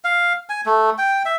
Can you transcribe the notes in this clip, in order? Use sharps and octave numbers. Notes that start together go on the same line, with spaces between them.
F5
G#5
A3
G5
E5